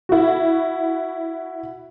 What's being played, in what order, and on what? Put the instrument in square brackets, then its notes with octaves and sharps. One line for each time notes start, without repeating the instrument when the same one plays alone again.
[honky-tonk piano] E4 F#4